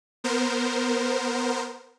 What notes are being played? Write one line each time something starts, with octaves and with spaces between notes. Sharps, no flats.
B3 A#4 C5